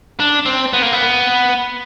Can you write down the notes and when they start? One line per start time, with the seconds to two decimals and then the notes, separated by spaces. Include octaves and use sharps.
0.20 D4
0.46 C4
0.73 B3
0.82 A#3
0.92 B3